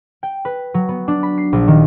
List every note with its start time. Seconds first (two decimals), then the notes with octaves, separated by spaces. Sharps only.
0.23 G5
0.45 B4
0.74 F#3
0.89 B3
1.08 D4
1.23 B5
1.38 C7
1.53 A#1
1.68 D#3